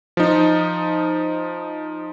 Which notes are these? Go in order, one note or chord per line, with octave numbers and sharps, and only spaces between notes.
F3 D#4